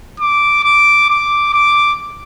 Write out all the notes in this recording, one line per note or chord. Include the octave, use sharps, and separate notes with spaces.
D6
D6
D6
D6